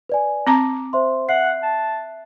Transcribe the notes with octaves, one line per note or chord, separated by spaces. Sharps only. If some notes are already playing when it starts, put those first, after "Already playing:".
B4 D5 G#5
C4 A5 A#5 D6
C5 E5 C6
E5 F#5 F#6 C7
A5